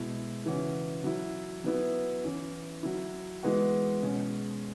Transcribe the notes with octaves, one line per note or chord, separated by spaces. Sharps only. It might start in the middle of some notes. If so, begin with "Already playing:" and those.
Already playing: B2 G#3 E4
C#3 E3 C#4 F#4
F#3 E4
F#3 B3 E4
E3 C#4 E4
F#3 E4
E3 G#3 B3 F#4
B2 G#3 C#4